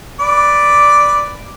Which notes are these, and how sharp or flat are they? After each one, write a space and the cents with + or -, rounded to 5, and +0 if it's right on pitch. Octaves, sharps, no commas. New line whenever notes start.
B4 +0 D5 +0